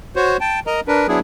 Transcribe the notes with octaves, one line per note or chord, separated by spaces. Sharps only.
F#4 C5 C#5
G5 A5
A#4 D#5 A#5
D4 A#4 B4
F#3 B3 D4 E4 G#4